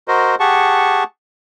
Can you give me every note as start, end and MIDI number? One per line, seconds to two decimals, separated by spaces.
0.08 0.35 66
0.08 0.35 70
0.08 0.35 72
0.08 0.35 75
0.40 1.04 67
0.40 1.04 68
0.40 1.04 78
0.40 1.04 81
0.40 1.04 85